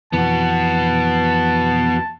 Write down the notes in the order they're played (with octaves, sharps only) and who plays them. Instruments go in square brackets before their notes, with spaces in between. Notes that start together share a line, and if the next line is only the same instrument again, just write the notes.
[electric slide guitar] F2 E3 [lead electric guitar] B3 F#4 [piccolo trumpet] A5